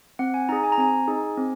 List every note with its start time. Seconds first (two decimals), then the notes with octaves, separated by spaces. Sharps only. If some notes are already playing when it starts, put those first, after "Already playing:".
0.19 C4 F#5
0.34 G#5
0.49 D#4 G#4 A#5
0.64 G#5
0.72 A#5
0.78 C4 G#5
1.08 D#4 G#4
1.37 C4